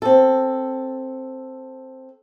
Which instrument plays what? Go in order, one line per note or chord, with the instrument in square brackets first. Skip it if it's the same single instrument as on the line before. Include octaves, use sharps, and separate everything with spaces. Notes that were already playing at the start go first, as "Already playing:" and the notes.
[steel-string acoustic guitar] C4 A4